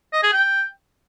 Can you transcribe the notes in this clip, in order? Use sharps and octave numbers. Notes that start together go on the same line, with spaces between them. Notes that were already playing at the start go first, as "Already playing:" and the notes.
D#5
G#4
G5